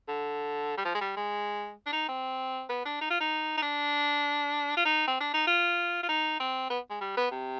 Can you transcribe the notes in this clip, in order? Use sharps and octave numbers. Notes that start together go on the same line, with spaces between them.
D3
G3
F3
G#3
G3
G#3
D4
D#4
C4
B3
D4
D#4
F4
D#4
D#4
D4
F4
D#4
C4
D4
D#4
F4
F4
D#4
C4
B3
G#3
G3
B3
C3